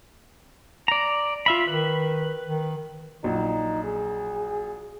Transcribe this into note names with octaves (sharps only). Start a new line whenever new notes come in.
D5 A#5
F4 E5 B5
D#3 B4
D#3
A#1 F#3 D#4
G#4